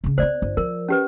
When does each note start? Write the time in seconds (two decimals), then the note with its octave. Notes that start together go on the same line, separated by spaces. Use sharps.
0.04 C#3 C#4
0.18 A#3 B3 C5 D5
0.42 G1
0.57 F3 A#4
0.89 C#4 G4 B4